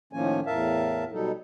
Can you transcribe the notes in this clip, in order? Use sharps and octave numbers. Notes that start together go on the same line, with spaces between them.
A2 D#3 F3 A#3 C#4 G#5
E2 A2 A#4 E5 F5 A5
B2 F#3 G3 D#4 A4